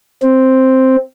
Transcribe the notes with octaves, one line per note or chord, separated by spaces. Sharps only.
C4